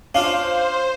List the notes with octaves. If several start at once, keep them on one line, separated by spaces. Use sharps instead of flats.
C#4 D4 F4 C5 F5